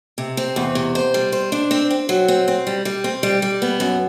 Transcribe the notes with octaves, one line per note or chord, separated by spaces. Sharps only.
C3
C4
E2
C3
C5
G3
C5
D4
C4
C4
F#3
C4
C4
G3
G3
C4
G3
G3
B3
F#2